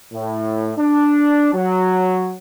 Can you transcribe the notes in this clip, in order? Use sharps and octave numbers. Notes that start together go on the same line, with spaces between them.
A2
D4
F#3